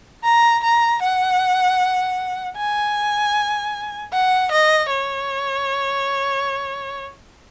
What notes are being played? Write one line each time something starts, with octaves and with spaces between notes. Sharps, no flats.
A#5
A#5
F#5
G#5
F#5
D#5
C#5